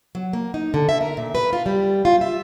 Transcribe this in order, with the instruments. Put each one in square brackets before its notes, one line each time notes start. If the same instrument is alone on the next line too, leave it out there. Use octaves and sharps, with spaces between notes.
[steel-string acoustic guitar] F#3
A#3
D#4
D3
E5
A#4
A#2
B4
F4
G3
F4
E5